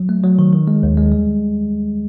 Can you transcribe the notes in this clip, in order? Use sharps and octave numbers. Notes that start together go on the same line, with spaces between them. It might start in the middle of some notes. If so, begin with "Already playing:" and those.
Already playing: F#3
A3
F#3
D#3
D#3
G#3
D#2
G#3
G3